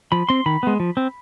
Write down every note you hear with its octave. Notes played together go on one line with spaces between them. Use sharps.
F3 B5
C4 C6
D#3 B5
G#3 B3
F3
C4